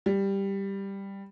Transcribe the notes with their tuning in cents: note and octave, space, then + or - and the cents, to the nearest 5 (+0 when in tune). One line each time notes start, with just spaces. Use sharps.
G3 +5